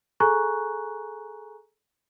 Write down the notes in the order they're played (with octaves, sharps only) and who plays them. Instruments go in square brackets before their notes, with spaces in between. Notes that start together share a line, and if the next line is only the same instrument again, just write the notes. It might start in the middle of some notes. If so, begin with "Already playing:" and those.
[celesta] G#4 A4 G#5 A#5 C#6 F#6